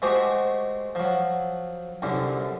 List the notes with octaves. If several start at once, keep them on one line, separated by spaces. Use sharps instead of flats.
G#3 A3 C4 F#4 G4
F3 F#3
C2 F#2 D3